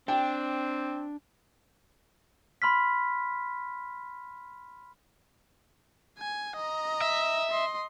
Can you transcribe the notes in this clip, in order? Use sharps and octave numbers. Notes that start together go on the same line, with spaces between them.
C4 D4 G5
B5 C6 F6 B6
G#5
D#5 A#5
E5
D#5 C6